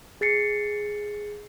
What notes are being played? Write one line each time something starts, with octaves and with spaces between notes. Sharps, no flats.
G#4 A6 C7 C#7